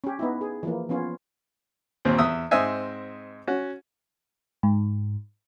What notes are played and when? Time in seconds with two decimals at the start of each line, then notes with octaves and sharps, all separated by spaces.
0.04 C#4 G4
0.19 B3 D#4 E4
0.41 G#4
0.63 E3 F3 A#3
0.89 F3 B3 C#4 F4
2.05 D#2 A#2 C4
2.18 E2 E5 D#6 E6
2.51 G#2 C4 D#5 E5 G#5
3.48 C#4 F#4
4.63 G#2